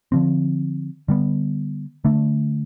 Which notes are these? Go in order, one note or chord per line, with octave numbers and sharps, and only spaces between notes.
D3 F3 C4
D3 G3 B3
D3 A3 D4